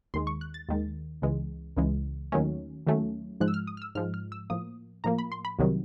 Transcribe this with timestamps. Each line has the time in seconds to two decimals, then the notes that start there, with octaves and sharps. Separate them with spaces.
0.14 D#2 D#3 G#3 C6
0.27 C#6
0.41 F#6
0.54 A6
0.69 D#2 D#3 G#3
1.22 C#2 C#3 E3 G#3
1.77 C#2 C#3 E3 G#3
2.32 D#2 D#3 F#3 A3 C#4
2.87 D#2 D#3 F#3 A3 C#4
3.40 G#2 F3 G#3 F#6
3.48 E6
3.54 F6
3.67 D#6
3.77 F6
3.82 E6
3.95 G#2 F3 G#3 F6
4.14 F6
4.32 E6
4.50 A2 F3 A#3 D#6
5.04 A2 F3 A#3 A#5
5.18 B5
5.32 C6
5.45 B5
5.59 C2 C3 D#3 F#3